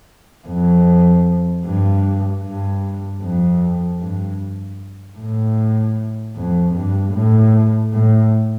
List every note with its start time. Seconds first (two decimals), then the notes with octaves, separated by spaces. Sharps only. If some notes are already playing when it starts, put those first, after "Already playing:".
0.47 F2
1.65 G2
2.44 G2
3.22 F2
4.01 G2
5.18 A2
6.35 F2
6.74 G2
7.13 A2
7.92 A2